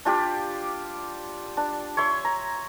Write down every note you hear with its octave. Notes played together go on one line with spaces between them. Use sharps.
D4 F4 G4 D5
D4
C#5 E5 C6
A#5